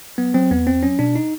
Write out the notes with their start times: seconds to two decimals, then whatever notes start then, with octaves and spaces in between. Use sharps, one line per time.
0.18 F#3 B3
0.34 F#3 C4
0.51 E2 B3
0.67 E2 C4
0.83 F#3 C#4
0.99 B2 D4
1.16 D#4